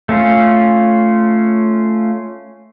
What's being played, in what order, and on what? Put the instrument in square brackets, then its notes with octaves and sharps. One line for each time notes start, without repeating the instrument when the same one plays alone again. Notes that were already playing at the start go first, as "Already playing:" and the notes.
[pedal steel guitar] A3 C#4 F4